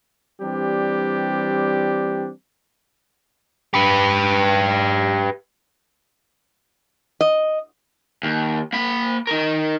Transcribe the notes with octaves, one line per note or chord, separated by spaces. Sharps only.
E3 G3 C4 D4 G4
G4 B4
D#5
D#2
A#3 B5
D#4 A#4